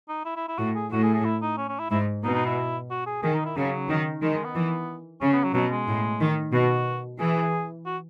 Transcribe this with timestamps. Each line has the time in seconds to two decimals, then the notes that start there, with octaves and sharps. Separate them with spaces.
0.09 D#4
0.25 E4
0.36 E4
0.48 E4
0.58 A2 F#4
0.75 G#4
0.92 A2 F#4
1.03 G#4
1.14 G#4
1.25 E4
1.42 D#4
1.58 C#4
1.69 C#4
1.79 E4
1.91 G#2 E4
2.23 B2 D#4
2.35 D#4
2.47 E4
2.90 F#4
3.06 G#4
3.22 D#3 G#4
3.34 D#4
3.46 E4
3.56 C#3 F#3
3.89 D#3
4.22 D#3 G#3
4.34 G#3
4.44 B3
4.55 E3
5.21 C#3 C#4
5.33 B3
5.44 F#3
5.54 B2 F#3
5.71 G#3
5.87 A2
6.20 D#3
6.53 B2 F#4
7.19 E3 G#4
7.86 F#4